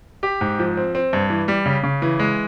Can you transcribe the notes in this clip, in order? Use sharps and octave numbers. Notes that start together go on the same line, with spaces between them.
G4
G#2
F3
C4
C4
G2
E3
G3
C#3
C#3
E3
G#3